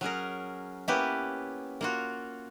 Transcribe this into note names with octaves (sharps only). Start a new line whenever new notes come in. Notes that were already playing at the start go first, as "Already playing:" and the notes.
F#3 C#4 G#4 A#4
A#3 B3 C#4 E4 G4 B4
A#3 F4 F#4